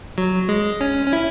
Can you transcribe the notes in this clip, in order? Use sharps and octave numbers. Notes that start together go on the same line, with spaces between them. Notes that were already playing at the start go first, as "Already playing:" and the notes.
F#3
G#3
C#4
C#4
E4